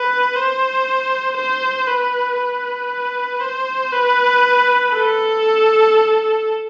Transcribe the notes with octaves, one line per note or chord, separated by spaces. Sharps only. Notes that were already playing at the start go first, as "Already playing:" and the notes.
Already playing: B4
C5
C5
B4
B4
C5
B4
A4